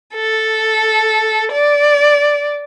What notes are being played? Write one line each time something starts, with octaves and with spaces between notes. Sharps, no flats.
A4
D5